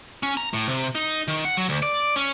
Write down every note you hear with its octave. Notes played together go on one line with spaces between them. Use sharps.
C#4
A#5
A2
C3
D#4
D#3
F#5
F#3
D2
D5
C#4